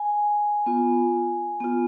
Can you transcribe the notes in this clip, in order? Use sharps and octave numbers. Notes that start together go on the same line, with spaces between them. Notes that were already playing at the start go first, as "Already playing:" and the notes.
Already playing: G#5
B3 F4
B3 F4